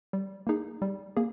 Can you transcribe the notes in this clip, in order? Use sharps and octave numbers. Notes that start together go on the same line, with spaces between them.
G3
A#3 D#4 G#4
G3
A#3 G#4